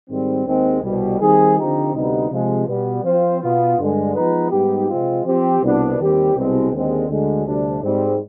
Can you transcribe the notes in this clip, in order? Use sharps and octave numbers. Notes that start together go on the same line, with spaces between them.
G#2 D#3 G3 C4
D#2 D#3 G#3 C4
C2 B2 G3
D#3 G3 C4 D#4 G#4
D3 F3 C4 D#4 G4
D2 C3 G3 B3 D#4
C3 F3 G#3
B2 G3 B3
F3 C4 F4 C5
B2 B3 F4
G2 D3 G#3
F3 G#3 B3 D#4 B4
G#2 G3 B3 D#4 G4
C3 F3 G#3 C4 F4
F3 C4 G4
C2 B2 B3 D4
D#2 D#3 G3 C4 G4
C2 B2 G#3 C4
D#2 D3 G#3 C4
D2 D3 G#3
D2 C3 G3 D4
G#2 G3 C4